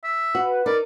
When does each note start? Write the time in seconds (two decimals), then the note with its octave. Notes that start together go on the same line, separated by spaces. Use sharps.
0.04 E5
0.35 F#4 B4
0.66 D#4 A#4 D5